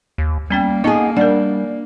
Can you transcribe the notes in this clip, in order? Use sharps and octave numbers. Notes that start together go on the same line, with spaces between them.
D#2
G3 A#3 B3 C#4 G5
B3 D#4 G#4 A5 C#6
G3 D4 A#4 F#5